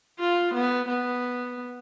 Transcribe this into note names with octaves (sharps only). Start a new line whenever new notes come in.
F4
B3
B3